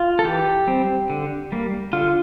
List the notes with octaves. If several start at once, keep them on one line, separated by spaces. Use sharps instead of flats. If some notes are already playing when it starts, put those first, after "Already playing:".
Already playing: F4
A4
E3 G4
G3 C4
D3
G3 A#3
D3 F4